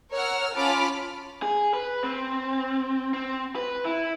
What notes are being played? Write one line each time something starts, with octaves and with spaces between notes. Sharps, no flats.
A#4 C#5 F#5 E6 F6
C#4 F4 A5 B5 D6 F6
G#4
B4
C4
C4
B4
E4